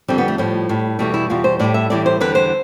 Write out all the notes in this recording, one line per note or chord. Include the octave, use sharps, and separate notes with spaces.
F2 D3 G3 C4
B3
A3
A2 F3 G3
A2 G3
E2 B2 G3 A3
E4
E2 B2 G3 F4
C5
A2 G3 D5
E5
A2 E3 G3 D5
C5
E2 D3 G3 B4
C5